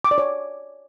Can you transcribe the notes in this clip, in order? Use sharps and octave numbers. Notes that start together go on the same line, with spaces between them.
D6
D5
C#5